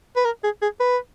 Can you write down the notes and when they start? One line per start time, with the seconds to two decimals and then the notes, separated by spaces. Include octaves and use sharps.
0.16 B4
0.25 A#4
0.44 G#4
0.62 G#4
0.80 B4